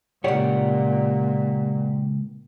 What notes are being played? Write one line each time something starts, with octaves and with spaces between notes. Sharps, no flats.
C#2 A#2 G4 C#5 D5 F#5